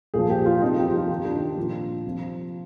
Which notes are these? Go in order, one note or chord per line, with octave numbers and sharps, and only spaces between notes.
A#2 F3 G#4
G4
F4
C3 F3 D#4
G4
F4
F4
C3 D#3 G4
D4
D#4
A#2 F3 F4
C3 F3